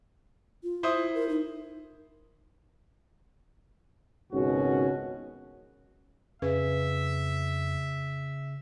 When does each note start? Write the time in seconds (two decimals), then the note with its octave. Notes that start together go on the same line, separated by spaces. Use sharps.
0.63 F4
0.83 E4 C5 D#6
1.14 A#4
1.29 D#4
4.33 G#1 C#2 B2 D#3 C#4 F#4
6.42 F2 C#3 B4 E5